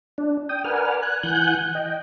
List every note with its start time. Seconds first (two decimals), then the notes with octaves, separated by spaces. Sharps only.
0.18 D4
0.49 G5 D#6
0.64 A#4 B4 D5 F#5 G#5 F6
1.02 G#5 F#6
1.23 E3 F#5 G#5 F#6 G6
1.75 D#5 G5